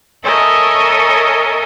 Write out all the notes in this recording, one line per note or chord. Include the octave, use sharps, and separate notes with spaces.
A4 A#4 C#5 D#5 E5 G#5